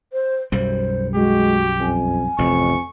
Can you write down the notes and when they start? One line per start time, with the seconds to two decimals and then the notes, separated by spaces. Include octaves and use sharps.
0.13 C5
0.52 B1 F#2 G3 C5
1.16 G#3 F#4 G4
1.80 F2 G#5
2.38 A1 F2 C3 C#6